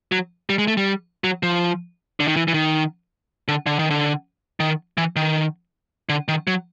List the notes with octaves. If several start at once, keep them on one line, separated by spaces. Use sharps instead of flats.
F#3
G3
G#3
A3
G3
F#3
F3
D3
D#3
E3
E3
D#3
D3
D3
D#3
D3
D#3
E3
D#3
D3
D#3
F#3